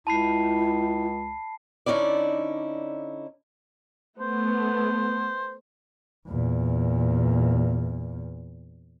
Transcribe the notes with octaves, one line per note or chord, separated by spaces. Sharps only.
C#2 E4 A5 B5 C7
D3 C#4 D#4 E4 D5
A3 B3 C5
E2 A#2